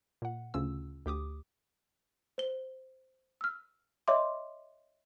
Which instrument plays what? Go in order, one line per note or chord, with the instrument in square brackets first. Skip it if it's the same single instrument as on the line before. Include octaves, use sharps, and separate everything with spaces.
[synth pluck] A#2 F#5
D2 C#3 C#4 F4 E6
D2 G4 D6 D#6
[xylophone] C5 G7
E6 F6
C#5 D#5 E5 C6 D6